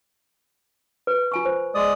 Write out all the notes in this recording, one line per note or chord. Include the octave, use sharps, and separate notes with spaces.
B4
F4 G#5 C#6
C5
G#3 D5 D#6